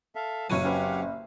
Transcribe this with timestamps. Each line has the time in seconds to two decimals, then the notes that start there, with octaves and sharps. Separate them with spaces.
0.15 A4 E5 F5
0.50 F#1 C3 F#3 F#4 B4 C#5 D#7
0.64 C4 C#4 G4 B4 F5 F#5